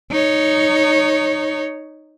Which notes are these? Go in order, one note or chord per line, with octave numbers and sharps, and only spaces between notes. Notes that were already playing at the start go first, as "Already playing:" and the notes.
D#4 C#5